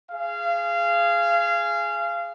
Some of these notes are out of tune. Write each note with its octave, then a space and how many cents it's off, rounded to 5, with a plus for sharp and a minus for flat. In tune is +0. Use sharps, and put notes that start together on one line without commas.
G#4 +0 F5 -25